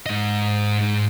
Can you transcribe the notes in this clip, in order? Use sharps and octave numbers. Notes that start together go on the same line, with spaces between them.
G#2 D#5